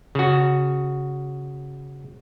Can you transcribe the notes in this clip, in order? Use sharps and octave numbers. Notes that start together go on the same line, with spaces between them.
C#3 F#4